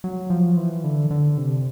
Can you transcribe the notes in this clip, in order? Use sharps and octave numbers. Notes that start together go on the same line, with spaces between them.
F#3
F3
E3
D3
D3
C3